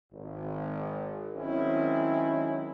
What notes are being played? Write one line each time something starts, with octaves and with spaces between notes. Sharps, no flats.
G#1
D#3 F#3 G#3 C4 C#4 E4